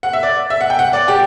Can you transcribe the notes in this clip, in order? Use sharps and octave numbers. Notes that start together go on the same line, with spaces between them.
F#5
E5
D5
E5
F#5
G5
F#5
D5
G4